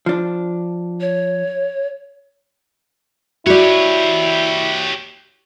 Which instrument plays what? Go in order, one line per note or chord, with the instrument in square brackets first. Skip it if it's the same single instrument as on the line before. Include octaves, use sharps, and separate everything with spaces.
[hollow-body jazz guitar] F3 D4
[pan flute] C#5
[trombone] E4 [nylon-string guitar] F#4 D5 [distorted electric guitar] G4 C#5